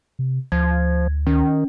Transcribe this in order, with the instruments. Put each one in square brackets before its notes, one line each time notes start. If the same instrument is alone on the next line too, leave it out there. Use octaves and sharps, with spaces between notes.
[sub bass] C3
[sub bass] D2 [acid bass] F3 [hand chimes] G#6
[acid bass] D#3 [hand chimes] C#4